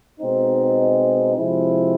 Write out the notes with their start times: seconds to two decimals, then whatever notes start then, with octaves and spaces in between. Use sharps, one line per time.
0.20 B2 G#3 C4 D#4
1.36 C3 F3 G#3 C4 E4